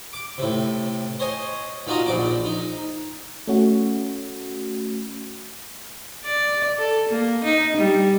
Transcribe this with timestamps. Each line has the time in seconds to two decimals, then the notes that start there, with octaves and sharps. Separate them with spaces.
0.13 D6
0.38 A2 C3
1.20 C5 C#5 D#5 G#5
1.87 A#2 D#4 F4 F#4 D#5 A#5
2.06 A#1 A#2 F3 D4 D6
2.45 D#4
3.48 A3 C#4 F#4
6.24 D5
6.78 A4
7.09 A#3
7.44 D#4
7.77 G3